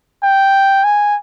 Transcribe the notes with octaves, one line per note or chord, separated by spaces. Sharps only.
G5
G#5